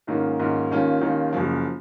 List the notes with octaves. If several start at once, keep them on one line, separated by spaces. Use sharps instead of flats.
G#2 D#3 A#3 C#4 F4
G#2 D#3 A#3 C#4 F4
D#2 D#3 A#3 C#4 F4
D#2 D#3 A#3 C#4 F4
F#1 F#2 F3